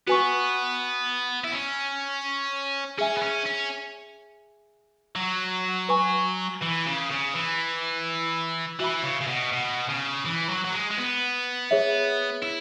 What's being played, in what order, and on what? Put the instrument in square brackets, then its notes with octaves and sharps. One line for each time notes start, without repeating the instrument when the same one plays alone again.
[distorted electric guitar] B3 [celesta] F#4 B4 G#5 C#6
[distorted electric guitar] E4
C#4
[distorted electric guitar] C#4 [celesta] G#4 E5 G#5
[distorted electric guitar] B3
C#4
C#4
F#3
[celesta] B4 G#5 C#6
[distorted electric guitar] E3
C#3
C#3
E3
[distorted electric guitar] E3 [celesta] F#4 E5 B5
[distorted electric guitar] C#3
C#3
B2
B2
C#3
E3
F#3
F#3
G#3
G#3
B3
[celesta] G#4 C#5 E5
[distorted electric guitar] E4